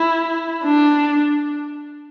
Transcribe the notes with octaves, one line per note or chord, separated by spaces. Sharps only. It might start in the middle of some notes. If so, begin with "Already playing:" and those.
Already playing: E4
D4